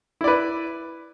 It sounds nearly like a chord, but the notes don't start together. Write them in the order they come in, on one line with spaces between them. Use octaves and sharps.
E4 D5 B4